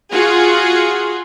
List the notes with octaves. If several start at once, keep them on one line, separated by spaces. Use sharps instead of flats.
F4 F#4 G#4